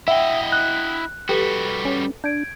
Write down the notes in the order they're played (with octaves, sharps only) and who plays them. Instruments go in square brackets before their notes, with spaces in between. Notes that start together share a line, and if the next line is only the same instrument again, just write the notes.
[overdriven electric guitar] E4 D#5 [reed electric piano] E5 [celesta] F#5 G5
[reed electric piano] F#6
[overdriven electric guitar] G3 F#4 [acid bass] G4 [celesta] A4 B4
[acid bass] C#4
[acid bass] D4 [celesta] G6 G#6 D7